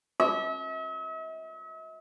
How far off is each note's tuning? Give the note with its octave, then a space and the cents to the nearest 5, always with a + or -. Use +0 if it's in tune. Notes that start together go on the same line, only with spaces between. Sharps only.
E5 -45